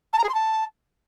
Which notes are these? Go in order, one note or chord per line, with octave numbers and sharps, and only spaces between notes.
A5
A#5
G#4
C6
A5